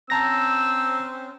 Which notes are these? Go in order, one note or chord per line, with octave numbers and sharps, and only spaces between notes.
C4 C#4 A5 A#5 E6 A#6